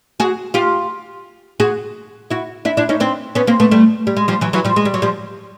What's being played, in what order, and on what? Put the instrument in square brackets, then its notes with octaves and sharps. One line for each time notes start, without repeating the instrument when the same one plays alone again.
[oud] F#4 G#4
F4 G4
F#4 G#4
E4 F#4
D4 E4
D4 E4
C#4 D#4
C4 D4
B3 C#4
A#3 C4
A3 B3
G3 A3
G3
G#3
F3 G3
E3 F#3
E3 F#3
F3 G3
G#3
G3
F#3
F3 G3